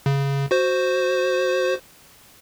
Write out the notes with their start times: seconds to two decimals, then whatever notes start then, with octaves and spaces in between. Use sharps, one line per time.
0.06 C#3
0.51 F#4 C5